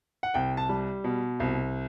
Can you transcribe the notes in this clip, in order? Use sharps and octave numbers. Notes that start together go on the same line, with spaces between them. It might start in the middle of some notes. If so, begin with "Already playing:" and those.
F#5
C2 G5
A5
G3
B2
C2